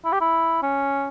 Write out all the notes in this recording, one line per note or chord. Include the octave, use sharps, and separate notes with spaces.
E4
G4
E4
C#4